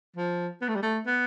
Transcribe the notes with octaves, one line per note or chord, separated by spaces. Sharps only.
F3
B3
A3
G3
A3
B3